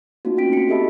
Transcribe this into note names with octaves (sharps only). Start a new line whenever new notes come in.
A3 A#3 C4 D#4 F4 F#4
C4 C#4 D#4 G5 B6 D7
D#4 F#4 C#7
G4 A4 D#5 E5 A5 B5